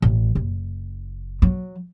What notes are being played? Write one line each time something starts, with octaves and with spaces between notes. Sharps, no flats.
A1
F#1
F#3